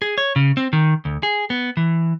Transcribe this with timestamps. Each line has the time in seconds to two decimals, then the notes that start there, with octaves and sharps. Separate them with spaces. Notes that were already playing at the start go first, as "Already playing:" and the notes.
0.02 G#4
0.18 C#5
0.36 C#3
0.57 C4
0.73 D#3
1.05 D2
1.23 G#4
1.50 B3
1.77 E3